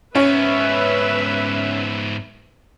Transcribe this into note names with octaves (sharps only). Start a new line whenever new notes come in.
G#2 B3 C#4 B4 E5